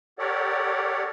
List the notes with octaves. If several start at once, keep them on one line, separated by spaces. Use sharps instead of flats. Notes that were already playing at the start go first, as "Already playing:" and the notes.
G4 A4 A#4 C#5 D5 F#5